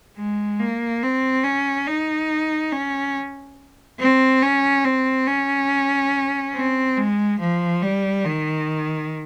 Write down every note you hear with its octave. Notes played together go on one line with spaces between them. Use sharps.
G#3
A#3
C4
C#4
D#4
C#4
C4
C#4
C4
C#4
C4
G#3
F3
G3
D#3